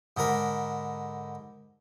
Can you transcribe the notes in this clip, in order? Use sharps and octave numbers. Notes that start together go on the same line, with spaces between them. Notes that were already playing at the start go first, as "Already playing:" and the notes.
G#2 D3 A#4 B5